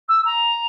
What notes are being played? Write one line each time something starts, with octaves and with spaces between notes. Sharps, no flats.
E6
A#5